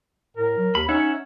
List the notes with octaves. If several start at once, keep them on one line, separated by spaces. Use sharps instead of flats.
A2 A#4
F#3
D#2 B5
C#4 D#4 C#5 E5 F#5